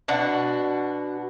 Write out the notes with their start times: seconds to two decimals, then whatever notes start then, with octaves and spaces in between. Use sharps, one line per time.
0.08 B2 D4 F#4